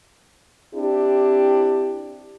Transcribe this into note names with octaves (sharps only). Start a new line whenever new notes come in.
C4 D4 E4 G4